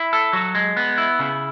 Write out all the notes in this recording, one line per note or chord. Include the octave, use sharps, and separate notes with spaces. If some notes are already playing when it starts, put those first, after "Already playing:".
Already playing: E4
A4
F#3
G#3
B3
E4
C#3